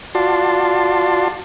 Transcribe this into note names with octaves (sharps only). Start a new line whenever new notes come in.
F4 F#4 D5 A5 C6